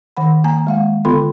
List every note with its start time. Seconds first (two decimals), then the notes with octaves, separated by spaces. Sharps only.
0.17 D#3 F#5 B5
0.44 A#3 G#5 A#5
0.67 G#3 F5 F#5
1.05 D3 B3 F4 A4 B5 C6